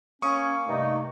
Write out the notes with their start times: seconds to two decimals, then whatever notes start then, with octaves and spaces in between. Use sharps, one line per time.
0.22 A#3 C#4 C#6 D#6
0.67 G2 C3 A3 D#4